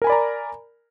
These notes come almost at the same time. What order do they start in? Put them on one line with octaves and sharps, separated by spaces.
A#4 G#5 B5 D5 A#5